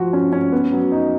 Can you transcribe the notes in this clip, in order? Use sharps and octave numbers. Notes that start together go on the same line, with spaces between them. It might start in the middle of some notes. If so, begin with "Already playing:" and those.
Already playing: F3 F#4
C#4
C#4
B3
F#3
D#4